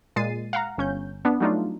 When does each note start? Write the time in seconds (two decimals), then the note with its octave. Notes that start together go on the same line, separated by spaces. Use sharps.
0.16 A#2 G#3 A6 C7 D#7
0.53 F5 F#5 A#5
0.78 G1 C#4 G6
1.25 B3 D4
1.40 F#3 G3 A3 D4 D#4 F4